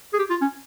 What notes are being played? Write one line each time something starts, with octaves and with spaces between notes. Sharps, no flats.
G#4
G4
F4
C#4